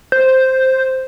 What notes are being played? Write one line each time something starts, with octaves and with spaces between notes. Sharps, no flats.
C5